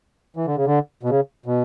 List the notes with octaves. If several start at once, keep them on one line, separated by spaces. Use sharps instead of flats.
E3
D3
C#3
D3
B2
C#3
B2